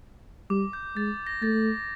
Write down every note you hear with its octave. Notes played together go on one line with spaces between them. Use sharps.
G3 D6
G6
G#3 A6
A#6
A3 A6